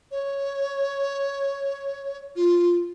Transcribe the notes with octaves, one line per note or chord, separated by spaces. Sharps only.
C#5
F4